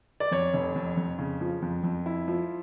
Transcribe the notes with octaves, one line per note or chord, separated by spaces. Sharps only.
D5
F2 C#5
F1
F2
F2
C#3
F3
F2
F2
E4
F3